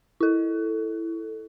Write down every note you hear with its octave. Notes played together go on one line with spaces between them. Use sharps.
E4 A4